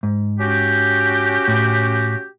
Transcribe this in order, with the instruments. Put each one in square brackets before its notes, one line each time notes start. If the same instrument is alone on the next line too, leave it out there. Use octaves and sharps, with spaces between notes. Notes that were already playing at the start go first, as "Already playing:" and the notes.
[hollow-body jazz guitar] G#2
[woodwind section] C#4 F#4 G4
[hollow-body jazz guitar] A2